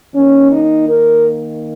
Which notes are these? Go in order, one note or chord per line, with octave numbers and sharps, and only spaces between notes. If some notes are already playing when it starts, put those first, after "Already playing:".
D#3 A#3 C#4
D#4
A#4